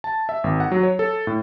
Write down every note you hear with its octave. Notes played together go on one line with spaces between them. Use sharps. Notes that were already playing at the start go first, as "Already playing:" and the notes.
A5
E5
G#1
F#5
F#3
C#5
A4
A2